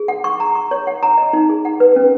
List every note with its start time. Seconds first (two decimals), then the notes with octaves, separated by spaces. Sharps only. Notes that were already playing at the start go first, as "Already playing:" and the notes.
Already playing: G#4
0.08 F#5
0.24 C#6
0.40 A#5
0.55 C#6
0.71 C#5
0.87 F#5
1.03 A#5
1.18 D#5
1.33 D#4
1.49 G#4
1.65 F#5
1.80 B4
1.96 C#4